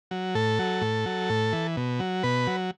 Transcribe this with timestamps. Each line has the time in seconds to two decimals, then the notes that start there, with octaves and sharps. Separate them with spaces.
0.11 F#3
0.35 A2 A4
0.59 F#3
0.82 A2
1.06 F#3
1.30 A2
1.53 E3
1.77 B2
2.00 F#3
2.23 B2 B4
2.47 F#3